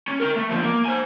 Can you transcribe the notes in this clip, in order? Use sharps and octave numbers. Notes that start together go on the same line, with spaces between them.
C#4
A#4 G5
A3
B2 F3
A#3
C5 G#5